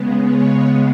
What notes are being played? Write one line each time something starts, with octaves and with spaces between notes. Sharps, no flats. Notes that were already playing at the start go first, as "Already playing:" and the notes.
Already playing: C#3 G#3 B3
C#5